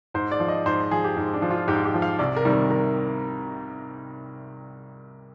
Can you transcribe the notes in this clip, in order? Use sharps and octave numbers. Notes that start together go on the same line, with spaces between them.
G#2 C5
D5
F3
D#5
G#2 C5
F3 G#4
G4
G#2
D4
F3
F4
G#2 G4
G4
F3
F5
C2 D5
A#4
C3 D#3 G3
A#4
A#4